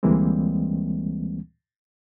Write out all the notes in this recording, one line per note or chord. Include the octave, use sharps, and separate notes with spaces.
D2 E3 G3 G#3 A#3 C4